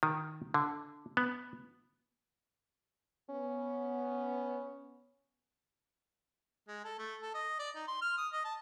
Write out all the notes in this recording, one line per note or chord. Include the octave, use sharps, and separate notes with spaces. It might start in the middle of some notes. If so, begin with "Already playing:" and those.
D#3
D3
B3
B3 C#4
G#3
A4
A3
A4
D#5
D5
D#4
C6
F6
D#6
D#5
A5